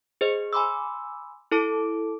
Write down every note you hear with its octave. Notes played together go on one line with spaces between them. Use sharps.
G#4 C5 D#5
G#5 B5 C6 D6 E6
E4 A4 A5 D6 D7